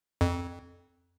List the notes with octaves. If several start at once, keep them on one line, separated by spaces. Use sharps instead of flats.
F2